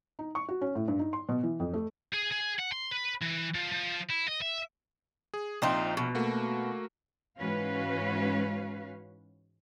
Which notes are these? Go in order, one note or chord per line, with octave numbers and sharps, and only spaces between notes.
D#4
C#6
F#4
C#4
A2
G2
D#4
C6
B2
E3
F2
A3
G#4
G#4
F#5
C6
B4
E3
F3
F3
E4
D#5
E5
G#4
A#1 C4 D#4 F4
B2
A3 A#3 F#4
G#2 E3 C#4 F#4 B4 F5